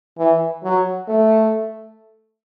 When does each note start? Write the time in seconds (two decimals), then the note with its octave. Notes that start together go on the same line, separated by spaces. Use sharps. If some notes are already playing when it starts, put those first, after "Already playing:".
0.18 E3
0.64 F#3
1.08 A3